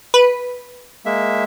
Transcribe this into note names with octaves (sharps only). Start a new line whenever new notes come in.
B4
G#3 A#3 E5